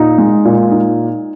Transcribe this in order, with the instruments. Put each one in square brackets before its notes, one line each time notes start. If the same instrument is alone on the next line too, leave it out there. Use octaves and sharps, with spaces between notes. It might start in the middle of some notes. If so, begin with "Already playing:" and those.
Already playing: [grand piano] A#2 D#4
G#3
A#2
D#4